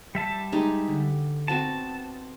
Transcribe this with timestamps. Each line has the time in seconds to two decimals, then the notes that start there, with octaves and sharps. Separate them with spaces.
0.15 G3 E5 A5
0.52 G#3 D#4 G4
0.88 D3
1.48 B3 C4 F#4 A5